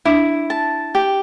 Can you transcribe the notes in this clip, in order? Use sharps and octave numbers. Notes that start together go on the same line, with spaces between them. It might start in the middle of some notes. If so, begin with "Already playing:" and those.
D4 E4
A5
G4